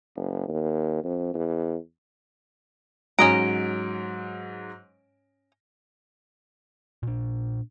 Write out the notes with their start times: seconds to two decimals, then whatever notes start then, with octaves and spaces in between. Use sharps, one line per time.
0.16 F#1
0.49 D#2
1.04 F2
1.34 E2
3.19 G#2 F#3 C#4 D#5 A#5 D7
7.03 A#2 D4